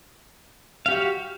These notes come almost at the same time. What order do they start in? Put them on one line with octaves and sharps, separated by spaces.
F5 G4 F#4